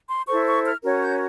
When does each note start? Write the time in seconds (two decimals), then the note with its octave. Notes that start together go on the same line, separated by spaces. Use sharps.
0.08 C6
0.27 E4 A4 C5 C#6
0.46 C#6
0.65 F6
0.83 C#4 F#4 A#4 C#5
1.01 G6